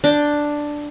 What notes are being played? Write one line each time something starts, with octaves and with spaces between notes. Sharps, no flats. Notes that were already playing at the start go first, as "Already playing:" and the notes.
D4 G5